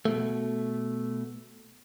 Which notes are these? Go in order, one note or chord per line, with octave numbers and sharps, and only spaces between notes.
B2 A3